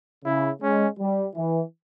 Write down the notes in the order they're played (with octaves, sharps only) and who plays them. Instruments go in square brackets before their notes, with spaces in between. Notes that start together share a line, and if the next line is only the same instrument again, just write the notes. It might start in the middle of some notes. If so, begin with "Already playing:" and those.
[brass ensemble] C#3 [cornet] E4
[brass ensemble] G#3 [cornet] C#4
[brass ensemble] G3
E3